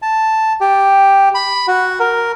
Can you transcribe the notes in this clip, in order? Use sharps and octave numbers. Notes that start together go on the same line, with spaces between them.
A5
G4
B5
F#4
A#4